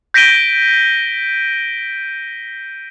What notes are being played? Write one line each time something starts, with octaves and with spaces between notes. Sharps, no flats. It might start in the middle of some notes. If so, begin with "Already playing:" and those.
G6 A#6 B6 D7 D#7 G7